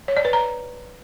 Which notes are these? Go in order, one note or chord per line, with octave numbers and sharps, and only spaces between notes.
C#5
D5
B4
A#5